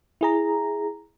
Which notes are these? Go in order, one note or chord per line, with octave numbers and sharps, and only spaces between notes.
E4 G#4 A#5